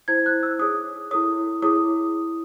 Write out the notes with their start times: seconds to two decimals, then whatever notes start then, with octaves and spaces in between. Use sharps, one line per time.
0.08 E4 C5 G#6
0.26 F#6
0.43 E6
0.59 D#4 G#4 C#5 D#6
1.11 E4 A4 C#5 D#6
1.62 E4 G#4 C#5 D#6